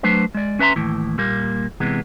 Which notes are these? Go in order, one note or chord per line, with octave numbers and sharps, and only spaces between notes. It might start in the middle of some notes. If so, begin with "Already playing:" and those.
F#3 A3 D4 B4 C5
G#3 D5
C#4 B4 E5 A#5 C6
D#2 A2 E3
A#2 G3 A#3
C3 E3 G#3 B3